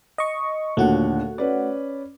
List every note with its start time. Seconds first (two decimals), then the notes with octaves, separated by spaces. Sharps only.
0.18 D#5 C#6
0.77 D#2 A#2 D3 A3 F#4 F#5
1.38 C#4 B4 D5